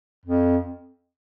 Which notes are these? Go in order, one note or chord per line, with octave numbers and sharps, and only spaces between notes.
F2